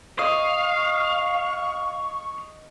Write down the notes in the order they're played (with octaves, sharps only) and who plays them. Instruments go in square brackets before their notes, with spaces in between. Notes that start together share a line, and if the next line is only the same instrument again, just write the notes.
[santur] D#5 [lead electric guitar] F5 [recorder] C#6